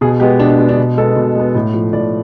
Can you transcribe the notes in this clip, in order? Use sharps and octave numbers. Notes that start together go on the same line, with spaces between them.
B2 G#4
G#3 B3 G4
B2 D4
D4
G#3 B3
D4
B2
G#3 B3 A4
B2
G#3 B3
A2
F3 A3
A2 D5